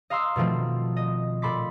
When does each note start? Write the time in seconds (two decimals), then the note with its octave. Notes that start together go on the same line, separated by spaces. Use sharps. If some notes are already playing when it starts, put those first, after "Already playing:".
0.10 D#5 F5 A#5 C6 E6
0.36 B2 D#3 F3 A3 C4
0.97 D#5
1.42 A#2 A4 B5 C6 D6 B6